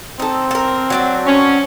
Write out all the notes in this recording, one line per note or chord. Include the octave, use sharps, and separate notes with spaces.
C4 D#4 A4
A4 A#4
F#3 D4 F#4
C#4